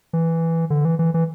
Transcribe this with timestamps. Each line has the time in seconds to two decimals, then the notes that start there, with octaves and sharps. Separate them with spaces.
0.13 E3
0.70 D3
0.85 E3
0.99 E3
1.14 E3